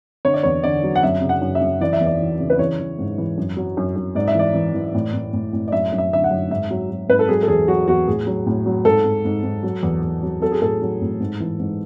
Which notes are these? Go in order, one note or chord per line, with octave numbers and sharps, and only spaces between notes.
D3 C#5
D5
E2 C#5
D3 D5
F#3
F#5
F#2 E5
C#3
F#5
F#2
E5
F#2
E3 D5
E5
E2
D5
E3
C#3
B4
E3 C#5
E3
G#2
E3
F#2
F#3
F#2
F#2
G#2 D5
E5
E3 D5
E3
E3
A2
A2
A2
A2
D5
F#2 E5
F#2
E5
D3 E5
F#5
F#2
G#2 E5
F#3
F#3
G#2 B4
A4
F#3 G#4
A4
E2 G#4
F#3 F#4
E2 F#4
A2 G#4
F#3
A2
F#3
G#2 A4
G#2
G#2
G#2
F#3
E2
E2
F#3
F#3 A4
G#4
A2 A4
F#3
A2
G#2
E3
G#2